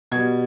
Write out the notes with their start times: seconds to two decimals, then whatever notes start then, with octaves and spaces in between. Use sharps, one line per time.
0.11 B2 G3 G#6